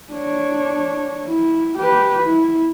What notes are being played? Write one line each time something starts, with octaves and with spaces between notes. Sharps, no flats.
D4 C#5
E4
G4 B4
E4